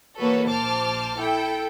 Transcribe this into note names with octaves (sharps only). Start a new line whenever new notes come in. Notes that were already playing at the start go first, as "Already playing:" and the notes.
E3 A#3 F#4 A4 B4 C#5
A#1 C5 A5 D6 F6
E4 A4 G5